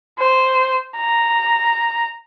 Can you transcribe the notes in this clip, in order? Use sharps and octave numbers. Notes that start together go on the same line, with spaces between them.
C5
A#5